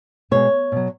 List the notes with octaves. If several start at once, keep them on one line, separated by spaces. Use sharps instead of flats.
B2 G#3 C#5
B2 F#3